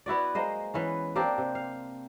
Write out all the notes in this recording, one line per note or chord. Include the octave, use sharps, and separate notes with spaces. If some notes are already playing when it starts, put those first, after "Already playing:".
B3 E4 F#4 D5
G#3 A#3 C5 D#5
E3 B3 C#4
A#3 C4 D4 G4
C3
F5